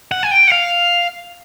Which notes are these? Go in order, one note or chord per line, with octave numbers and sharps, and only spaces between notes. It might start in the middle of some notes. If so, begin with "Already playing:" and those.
F#5
G#5
G5
F#5
F5